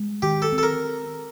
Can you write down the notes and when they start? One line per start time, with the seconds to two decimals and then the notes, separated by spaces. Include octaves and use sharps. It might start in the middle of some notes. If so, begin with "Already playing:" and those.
Already playing: G#3
0.22 D#3 G4
0.42 A4
0.52 C4
0.58 A4
0.63 A#4